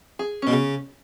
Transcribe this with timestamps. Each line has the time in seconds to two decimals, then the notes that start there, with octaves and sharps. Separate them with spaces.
0.19 G#4
0.42 B2 C#4
0.51 C#3